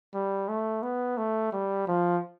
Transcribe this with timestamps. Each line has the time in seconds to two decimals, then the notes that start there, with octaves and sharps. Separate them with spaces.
0.14 G3
0.49 A3
0.83 B3
1.17 A3
1.53 G3
1.88 F3